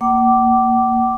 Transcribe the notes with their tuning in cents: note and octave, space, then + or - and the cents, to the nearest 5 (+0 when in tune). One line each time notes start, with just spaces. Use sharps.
A#3 -10 F#5 +45 D6 -5